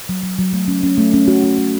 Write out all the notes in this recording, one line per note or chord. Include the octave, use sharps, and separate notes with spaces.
F#3
F#3
F#3
A3
C#4
C#4
A3
C#4
F#4
F#4
C#4